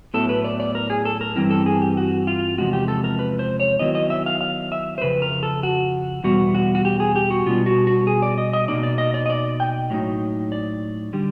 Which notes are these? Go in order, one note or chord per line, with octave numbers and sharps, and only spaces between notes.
A2 F#3 B3 E4 A4
B4
D5
D5
A#4
G#4
A4
A#4
G2 E3 G3 C4 E4 A#4
A4
G#4
G4
F#4
F4
E2 C3 F3 G#3 F#4
G4
A4
A#4
B4
C5
C#5
D#3 F#3 B3 E4 D#5
D#5
E5
F5
F5
E5
C5
F2 C#3 B4
A#4
A4
F#4
E2 B2 G3 B3 F#4
F#4
F#4
G4
G#4
G4
F#4
B2 G3 B3 D4 F4
F#4
F#4
G#4
D5
D#5
D#5
B2 G3 A#3 D#4 D5
D5
D#5
D5
D#5
D5
G5
A2 F#3 A#3 D#4
D5
D3 G3